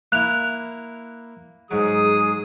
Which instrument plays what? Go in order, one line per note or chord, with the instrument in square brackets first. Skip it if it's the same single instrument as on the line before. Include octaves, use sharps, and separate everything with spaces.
[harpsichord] A#3 E4 [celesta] F#6 F7
[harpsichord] G#2 F#3 [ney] G#4 [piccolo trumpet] D#6